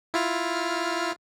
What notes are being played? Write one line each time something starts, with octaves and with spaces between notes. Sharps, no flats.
E4 F4 F6